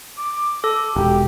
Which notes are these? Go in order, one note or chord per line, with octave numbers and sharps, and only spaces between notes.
D6
A4
E1 G4